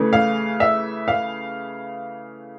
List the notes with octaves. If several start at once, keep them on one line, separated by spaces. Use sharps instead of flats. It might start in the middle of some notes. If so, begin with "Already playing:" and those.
Already playing: C#3 E3 A3 C#4
F5
E5
F5